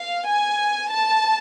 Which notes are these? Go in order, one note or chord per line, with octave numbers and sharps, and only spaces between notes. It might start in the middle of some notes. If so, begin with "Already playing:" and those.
Already playing: F5
G#5
A5